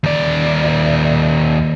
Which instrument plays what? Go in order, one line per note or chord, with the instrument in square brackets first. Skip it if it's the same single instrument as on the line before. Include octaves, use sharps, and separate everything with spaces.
[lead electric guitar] D#2 D5